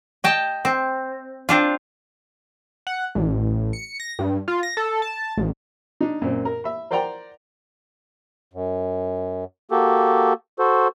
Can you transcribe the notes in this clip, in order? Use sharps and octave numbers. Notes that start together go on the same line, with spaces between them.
D#5 G5 A5
C4
C4 D4 F4
F#5
A1
C#7
A#6
G2
F4
A#6
A4
A5
A1
D4 D#4
F#2 A#2 C4
A#4
E5 B5
A#4 C5 D5 F#5 G5 A#5
F#2
A#3 F#4 G4 A4
F#4 A4 C5